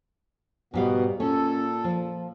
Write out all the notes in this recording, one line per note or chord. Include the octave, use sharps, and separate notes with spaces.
G#2 B2 G3 B3 F5
A#2 C#4 A4
F3